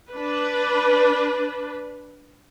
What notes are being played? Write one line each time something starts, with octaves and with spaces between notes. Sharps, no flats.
D4 B4